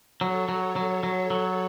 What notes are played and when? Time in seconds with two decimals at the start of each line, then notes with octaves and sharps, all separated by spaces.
0.21 F#3 A4 C#5
0.49 F#3
0.76 F#3
1.03 F#3
1.30 F#3